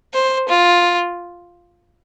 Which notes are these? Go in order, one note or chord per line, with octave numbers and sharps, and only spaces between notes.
C5
F4